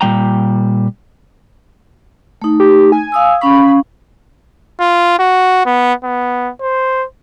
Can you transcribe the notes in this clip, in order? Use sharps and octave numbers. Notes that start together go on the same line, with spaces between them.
A#2 G3 G5 A#5
A3 D#4
G4
G#5
F5 D#6 E6
C#4 F5 B5 C#6
F4
F#4
B3
B3
C5